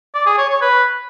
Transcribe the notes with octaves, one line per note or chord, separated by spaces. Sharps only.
D5
G#4
C#5
C#5
B4